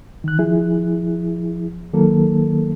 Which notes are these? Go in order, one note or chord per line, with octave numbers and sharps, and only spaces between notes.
D#3 F#6
F3 E4 G#4
D#3 F#3 A#3 A4